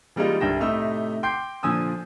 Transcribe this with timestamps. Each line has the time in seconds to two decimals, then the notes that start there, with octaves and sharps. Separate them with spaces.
0.16 E3 G3 G#3 A#3 D#4 F4
0.41 C2 G2 D3 G5 A#6 E7
0.59 A2 C3 A3 D#4 E5 E6
1.23 G5 C6 D6 G6 C7
1.63 A#2 D3 F3 G#5 D#6 E6